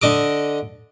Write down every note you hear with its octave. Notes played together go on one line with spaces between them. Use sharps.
D3 D#5 D6